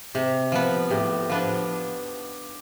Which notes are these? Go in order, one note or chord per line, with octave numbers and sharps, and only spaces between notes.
C3 G4
F3 B3
A2 G4
F3 B3 D4